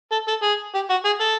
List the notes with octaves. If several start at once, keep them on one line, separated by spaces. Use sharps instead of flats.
A4
A4
G#4
G4
F#4
G#4
A4